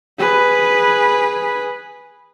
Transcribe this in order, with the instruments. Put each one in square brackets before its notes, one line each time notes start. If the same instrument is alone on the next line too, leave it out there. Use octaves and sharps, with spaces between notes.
[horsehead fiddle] G#4 B4